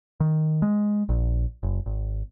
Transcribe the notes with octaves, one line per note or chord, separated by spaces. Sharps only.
D#3
G#3
A#1
F#1
G#1